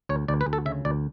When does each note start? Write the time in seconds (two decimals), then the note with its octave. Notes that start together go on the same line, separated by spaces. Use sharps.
0.09 D2 C#5
0.28 D2 D5
0.41 B4
0.46 D2
0.53 A4
0.66 C#3 E5
0.85 D2 D5